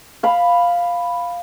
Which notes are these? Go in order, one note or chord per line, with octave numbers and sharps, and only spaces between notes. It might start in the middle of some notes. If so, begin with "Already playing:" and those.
F5 B5